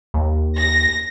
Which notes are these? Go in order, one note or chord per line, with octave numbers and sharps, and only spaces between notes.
D#2
A#6